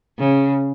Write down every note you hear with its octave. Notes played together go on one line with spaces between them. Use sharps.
C#3